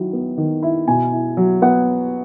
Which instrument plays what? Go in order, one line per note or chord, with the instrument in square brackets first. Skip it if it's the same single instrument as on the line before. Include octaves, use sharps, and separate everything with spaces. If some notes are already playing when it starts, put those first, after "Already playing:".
Already playing: [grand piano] D#3 F#3 E4
B3
D#3
E4
B2 G#5
E4
F#3
B3 F#5